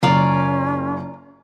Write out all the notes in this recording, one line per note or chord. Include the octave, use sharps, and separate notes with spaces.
F#1 C#4 F4 A#4 D5